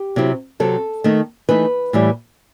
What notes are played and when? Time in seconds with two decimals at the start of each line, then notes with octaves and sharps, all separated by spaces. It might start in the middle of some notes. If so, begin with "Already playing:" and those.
Already playing: G4
0.16 C3 F#3 C4 E4
0.60 C3 F#3 C4 A4
1.04 D#3 A3 D#4
1.49 E3 A3 D#4 B4
1.93 A2 E3 G3